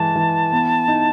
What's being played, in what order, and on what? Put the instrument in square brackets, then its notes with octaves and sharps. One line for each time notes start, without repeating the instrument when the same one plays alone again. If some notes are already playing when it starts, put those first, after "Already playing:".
Already playing: [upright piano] E3 G#3 [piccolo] A5
[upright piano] E3
B3
D#4